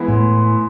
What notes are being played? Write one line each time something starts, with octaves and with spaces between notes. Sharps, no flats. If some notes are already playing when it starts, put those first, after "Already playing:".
Already playing: E3 G#3 B3 E4
A2